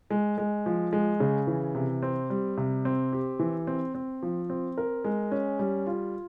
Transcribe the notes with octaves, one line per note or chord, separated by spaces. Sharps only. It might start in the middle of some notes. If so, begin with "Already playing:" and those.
G#3
G#3
F3
G#3
C#3
E3
C3
C4
G3
C3
C4
G4
E3
C4
C4
F3
C4
A#4
G#3
C#4
G3
F4